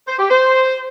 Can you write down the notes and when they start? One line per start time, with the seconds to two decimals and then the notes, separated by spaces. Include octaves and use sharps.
0.08 C5
0.19 G4
0.30 C5